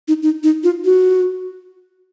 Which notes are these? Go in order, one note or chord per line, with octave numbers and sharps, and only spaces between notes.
D#4
D#4
D#4
F4
F#4